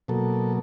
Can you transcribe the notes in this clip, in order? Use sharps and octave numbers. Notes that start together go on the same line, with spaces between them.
B2 F#3 A#3 A4